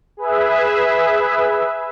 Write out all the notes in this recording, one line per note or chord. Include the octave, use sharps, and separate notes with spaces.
G#4 B4 E5